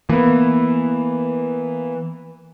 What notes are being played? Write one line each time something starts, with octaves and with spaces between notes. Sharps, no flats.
E3 A#3 B3